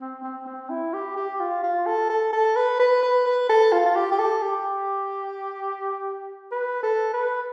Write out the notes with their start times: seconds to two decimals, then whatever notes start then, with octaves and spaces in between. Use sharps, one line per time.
0.01 C4
0.24 C4
0.47 C4
0.70 E4
0.94 G4
1.17 G4
1.40 F4
1.63 F4
1.87 A4
2.09 A4
2.33 A4
2.56 B4
2.80 B4
3.03 B4
3.26 B4
3.49 A4
3.72 F4
3.86 F4
3.96 G4
4.12 G4
4.19 A4
4.42 G4
6.52 B4
6.83 A4
7.14 B4